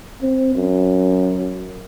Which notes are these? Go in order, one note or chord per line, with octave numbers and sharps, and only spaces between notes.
C4
F#2